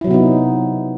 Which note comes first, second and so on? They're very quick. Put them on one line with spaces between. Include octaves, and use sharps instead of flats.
E4 F#3 C3 B3 D#4